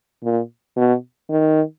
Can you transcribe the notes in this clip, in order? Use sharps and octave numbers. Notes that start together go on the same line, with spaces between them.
A#2
B2
D#3